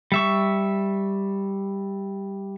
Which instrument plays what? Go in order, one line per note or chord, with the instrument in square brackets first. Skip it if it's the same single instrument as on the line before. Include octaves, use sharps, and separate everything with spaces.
[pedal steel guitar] G3 E5 C#6